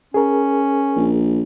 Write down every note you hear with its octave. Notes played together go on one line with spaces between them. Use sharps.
C#4 G#4 A#4
A#1